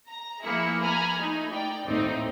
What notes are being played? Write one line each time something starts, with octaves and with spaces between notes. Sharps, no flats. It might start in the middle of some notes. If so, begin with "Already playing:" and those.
A#5
F3 A#3 E4 G#4 C#7
G#5 A#5 B5 F6
A3 D#4
D5 G5
A#1 D#2 A2 C4 D#4